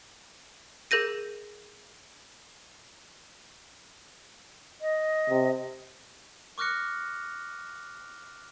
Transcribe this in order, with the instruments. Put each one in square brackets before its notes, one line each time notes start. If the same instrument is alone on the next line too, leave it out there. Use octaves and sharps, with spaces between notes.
[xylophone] G#4 A#4 G6 A#6 D#7
[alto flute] D#5
[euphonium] C3
[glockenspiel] C#6 D6 F6 F#6 A#6 C#7